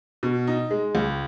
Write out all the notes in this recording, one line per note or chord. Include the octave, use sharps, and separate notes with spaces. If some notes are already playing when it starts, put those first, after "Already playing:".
B2
D#4
G#3
C#2